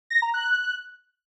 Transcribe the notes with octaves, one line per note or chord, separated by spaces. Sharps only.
A#6
A#5
F#6